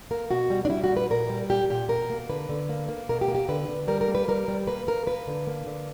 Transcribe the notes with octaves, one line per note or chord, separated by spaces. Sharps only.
A#3 A#4
B2 F#4
G3
D4
G3 E4
F#4
A#2
B4
A#2 A#4
G3
A#2 G4
A#2 G4
B2 A#4
A#3
D3 B4
D3
A#3
A#3
B2 A#4
G4
A#3
G4
D3 B4
D3
G3 A#4
A#4
A#3
B4
G3 A#4
G3
A#3 B4
A#3 A#4
A#3 B4
D3
A#3
D3